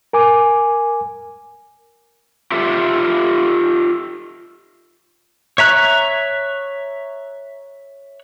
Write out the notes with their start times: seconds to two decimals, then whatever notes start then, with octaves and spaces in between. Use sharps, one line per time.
0.13 A#4 G#5 D6
2.51 F4 G4 A4 E5
5.58 C#5 E5 A#5 F#6